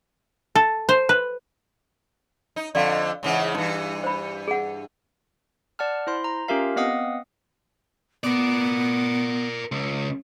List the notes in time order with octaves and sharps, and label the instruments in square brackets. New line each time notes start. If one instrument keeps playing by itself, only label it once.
[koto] A4
C5
B4
[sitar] D#4
[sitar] F2 D3 [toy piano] D5 F5
[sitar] G#2 C#3 E3
[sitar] G2 E3 [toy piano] D#4
[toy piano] C5 B5
G#4 F#5
[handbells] D5 F#5 A5 F6
E4 C5 C6
A#5
C#4 F4 G4 A#4 E5 F5
B3 C4 D#5 F5 F#5 D#6
[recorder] B3 [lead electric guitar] A#4 D5
[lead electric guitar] C#2